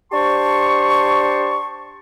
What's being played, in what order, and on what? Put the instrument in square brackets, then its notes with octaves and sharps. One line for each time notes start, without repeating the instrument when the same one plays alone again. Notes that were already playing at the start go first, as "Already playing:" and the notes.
[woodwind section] D4 G4 C5 A5 C6 C#6